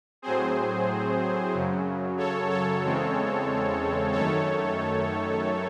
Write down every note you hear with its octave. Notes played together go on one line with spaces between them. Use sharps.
A2 F#3 C4 G#4 C5
F#2 C#3 F#3
A4 C#5
A4 C#5
E2 C#3 G#3 C4
F#2 D#3 A3 A4 C#5